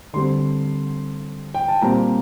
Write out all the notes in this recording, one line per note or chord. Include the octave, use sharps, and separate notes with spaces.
D3 G3 C4 C6
G5
A5
A#2 G3 C4 A#5